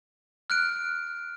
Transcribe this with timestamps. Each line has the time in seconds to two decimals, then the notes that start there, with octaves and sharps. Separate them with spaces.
0.50 F6 F#6 D7